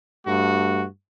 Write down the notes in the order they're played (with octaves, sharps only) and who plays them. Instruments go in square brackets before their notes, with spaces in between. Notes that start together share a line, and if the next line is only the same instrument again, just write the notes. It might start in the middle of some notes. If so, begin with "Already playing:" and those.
[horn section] G2 A3 F#4